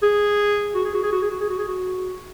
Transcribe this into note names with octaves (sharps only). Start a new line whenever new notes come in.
G#4
F#4
G#4
F#4
G#4
F#4
G#4
F#4
G#4
F#4
G#4
F#4